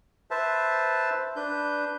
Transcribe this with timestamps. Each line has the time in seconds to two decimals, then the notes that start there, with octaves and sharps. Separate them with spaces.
0.31 B4 C5 E5 A5
1.36 D4 B4 G6